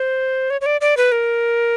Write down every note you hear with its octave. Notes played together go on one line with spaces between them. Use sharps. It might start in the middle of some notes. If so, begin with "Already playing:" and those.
Already playing: C5
C#5
C#5
D5
D5
B4
A#4